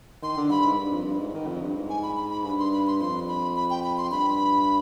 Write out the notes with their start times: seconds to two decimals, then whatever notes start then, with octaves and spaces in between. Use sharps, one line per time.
0.22 D#3 C6
0.37 D3
0.51 G2 B5
0.65 G#2
0.78 G2
0.92 F2
1.05 G2
1.19 G#2
1.34 D#3
1.47 F2
1.61 G2
1.76 G#2
1.89 G#5
2.03 B5
2.17 B5
2.30 B5
2.44 G2 B5
2.59 C6
2.73 B5
2.87 C6
3.00 F2 C6
3.28 B5
3.56 B5
3.70 G5
3.84 B5
3.98 C6
4.11 G2 B5